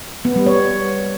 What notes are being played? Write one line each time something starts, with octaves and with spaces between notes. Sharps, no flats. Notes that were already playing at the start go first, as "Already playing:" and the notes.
B3
G3
C#5